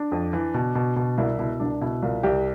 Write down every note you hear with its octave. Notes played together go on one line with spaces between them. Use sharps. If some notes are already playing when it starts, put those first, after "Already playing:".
Already playing: D4
F2
E3
B2
B2
B2
C2 E4
B2 E4
C2 D4
B2 E4
C2 F4
C2 G4